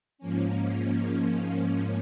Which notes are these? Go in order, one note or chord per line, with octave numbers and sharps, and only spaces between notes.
G#2 F3 A#3 C#4